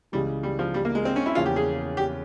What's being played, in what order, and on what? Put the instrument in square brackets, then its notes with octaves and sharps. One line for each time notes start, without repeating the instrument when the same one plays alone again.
[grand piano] C#2 C#3 E3 [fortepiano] G3
[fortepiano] G3
F3
G3
A#3
G#3
C4
C#4
E4
[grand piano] E2 C#3 F3 A#3 C#4 [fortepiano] F4
[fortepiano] G4
G#4
G4